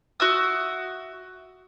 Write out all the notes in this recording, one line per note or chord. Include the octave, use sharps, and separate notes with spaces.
F#4 E5 D#6